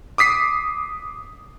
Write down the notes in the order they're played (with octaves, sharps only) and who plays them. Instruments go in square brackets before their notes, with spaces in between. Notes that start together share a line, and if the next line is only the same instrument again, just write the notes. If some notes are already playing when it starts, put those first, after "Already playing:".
[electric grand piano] D6 D#6 B6 C7